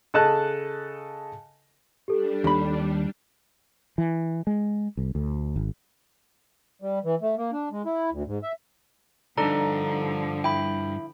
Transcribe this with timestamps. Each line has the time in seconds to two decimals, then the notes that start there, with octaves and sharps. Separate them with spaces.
0.14 C#3 A4 D#5 A5 F#6
2.08 G3 D4 G4 A4
2.44 D#2 B5
3.98 E3
4.47 G#3
4.97 C2
5.15 D2
5.56 G#1
6.82 G3
7.05 E3
7.22 A3
7.37 A#3
7.53 D4
7.72 G#3
7.85 E4
8.12 D2
8.27 G#2
8.43 E5
9.37 D2 G2 D3 F3 D4 D#4 A4 A#5
10.44 E4 G5 B5